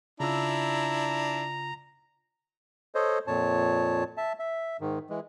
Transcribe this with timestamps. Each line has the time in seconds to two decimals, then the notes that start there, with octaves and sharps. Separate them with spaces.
0.20 C#3 D4 E4 F4 A#5 E6
2.95 A4 C5 C#5 D#5
3.27 F2 A#2 C#5 A5
4.17 E5 A5
4.39 E5
4.80 G#2 D#3
5.10 E3 G#3